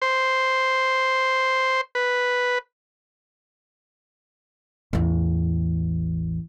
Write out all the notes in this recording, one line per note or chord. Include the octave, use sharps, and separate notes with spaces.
C5
B4
A1 E2